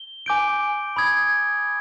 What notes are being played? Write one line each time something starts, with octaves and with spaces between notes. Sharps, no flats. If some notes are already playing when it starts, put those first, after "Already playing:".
Already playing: G7
G#5 D6 G6 D7
B5 D#6 G#6